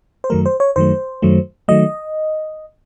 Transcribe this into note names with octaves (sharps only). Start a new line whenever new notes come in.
C5
F#2 D#3 F#3 A3 A#4
C5
C#5
F#2 D#3 F#3 A3 C5
F#2 D#3 F#3 A3
D#3 F#3 A3 D#5